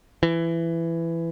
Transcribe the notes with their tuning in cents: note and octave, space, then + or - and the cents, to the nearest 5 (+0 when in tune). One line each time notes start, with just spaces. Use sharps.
E3 +15